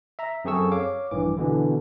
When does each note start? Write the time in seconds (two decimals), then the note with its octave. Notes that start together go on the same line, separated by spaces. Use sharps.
0.19 E5 A#5
0.45 F#2 C4 G#4 A4 C#6 E6
0.72 C#5 F5 D6
1.11 A#1 G2 E3 D6
1.37 B2 D3 E3